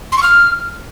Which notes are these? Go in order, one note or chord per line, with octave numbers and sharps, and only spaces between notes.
C6
C#6
F6